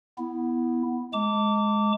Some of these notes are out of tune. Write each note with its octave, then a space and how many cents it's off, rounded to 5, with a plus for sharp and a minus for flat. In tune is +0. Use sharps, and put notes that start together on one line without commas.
B3 +0 E4 +0
G#3 +15 A5 +40 D6 -20